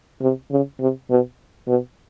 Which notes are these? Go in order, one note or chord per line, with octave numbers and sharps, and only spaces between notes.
C3
C#3
C3
B2
B2